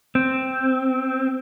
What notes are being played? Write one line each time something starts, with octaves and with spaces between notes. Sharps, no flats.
C4